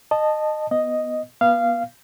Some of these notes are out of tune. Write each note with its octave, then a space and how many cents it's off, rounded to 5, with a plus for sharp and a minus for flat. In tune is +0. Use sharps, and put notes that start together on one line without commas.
D#5 -20 A5 +0
B3 +0 D#5 +0
B3 -30 F5 -15